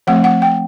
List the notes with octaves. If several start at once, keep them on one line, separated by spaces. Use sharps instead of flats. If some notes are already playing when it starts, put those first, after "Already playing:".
F3 A3 C4 F#5
F#5
G5